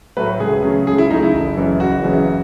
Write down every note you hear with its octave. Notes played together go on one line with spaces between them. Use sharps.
A2 F#3 A3 B4
C#2 G#4
C#3 F#3 A3
C#2 G#4
E4
C#3 F#3 A3 D#4
E4
F#1
F#2 C#3 E3
F#1 F#4
F#2 C#3 E3